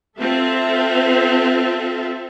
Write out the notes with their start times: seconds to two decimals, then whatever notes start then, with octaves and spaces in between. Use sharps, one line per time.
0.18 C4 F4 A4 E5